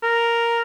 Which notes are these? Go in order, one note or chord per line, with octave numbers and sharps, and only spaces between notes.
A#4